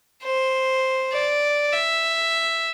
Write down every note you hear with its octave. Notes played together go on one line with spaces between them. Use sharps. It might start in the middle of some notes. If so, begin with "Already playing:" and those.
C5
D5
E5